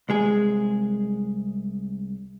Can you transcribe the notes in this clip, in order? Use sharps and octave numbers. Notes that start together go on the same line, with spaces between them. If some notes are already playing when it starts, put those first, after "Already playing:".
C2 G#3 G#4